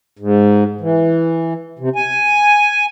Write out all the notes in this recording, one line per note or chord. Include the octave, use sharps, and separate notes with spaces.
G#2
E3
C3
G#5